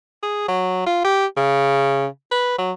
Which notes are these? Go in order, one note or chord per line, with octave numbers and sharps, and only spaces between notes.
G#4
F#3
F4
G4
C#3
B4
F#3